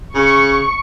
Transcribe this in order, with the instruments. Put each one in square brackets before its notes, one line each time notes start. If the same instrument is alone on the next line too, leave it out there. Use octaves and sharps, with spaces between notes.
[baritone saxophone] C#3 [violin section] C#6